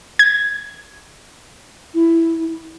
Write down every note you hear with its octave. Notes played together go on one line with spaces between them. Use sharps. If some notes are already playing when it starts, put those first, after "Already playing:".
G#6
E4